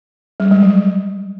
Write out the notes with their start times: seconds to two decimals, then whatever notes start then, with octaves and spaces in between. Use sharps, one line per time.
0.40 G3
0.51 G#3
0.62 F#3